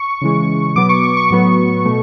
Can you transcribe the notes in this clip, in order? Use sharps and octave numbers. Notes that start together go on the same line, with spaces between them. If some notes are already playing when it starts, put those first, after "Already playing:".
Already playing: C#6
C#3 E3 G#3
B2 F#3 B3 D6
C#6
C#6
C#6
A2 F#3 B3
B2 A3